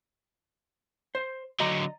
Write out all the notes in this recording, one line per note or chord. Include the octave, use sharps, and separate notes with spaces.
C5
D3 F#3 D#5 A#5